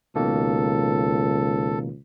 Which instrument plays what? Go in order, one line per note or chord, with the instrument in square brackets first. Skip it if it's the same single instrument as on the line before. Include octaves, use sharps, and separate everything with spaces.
[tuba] C#2 [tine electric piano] B2 D#3 A#3 [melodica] A4